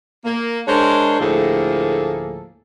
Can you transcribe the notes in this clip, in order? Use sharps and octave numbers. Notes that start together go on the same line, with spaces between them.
A#3
G#3 D4 A#4 C5 C#5
D2 A2 F3 A#3 G#4 A4